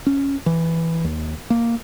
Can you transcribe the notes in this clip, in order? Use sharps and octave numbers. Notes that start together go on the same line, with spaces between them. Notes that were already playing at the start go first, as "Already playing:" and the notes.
C#4
E3
D#2
A#3